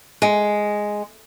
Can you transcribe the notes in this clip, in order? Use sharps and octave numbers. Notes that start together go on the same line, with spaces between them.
G#3